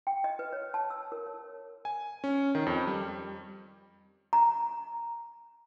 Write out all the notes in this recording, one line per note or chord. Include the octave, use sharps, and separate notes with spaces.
G5
D#5
B4
C#5
A5
E6
A#4
C#5
G#5
C#4
D#3
F2
G3
A#5